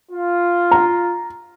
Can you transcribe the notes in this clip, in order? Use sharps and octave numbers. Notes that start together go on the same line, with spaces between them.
F4
A#5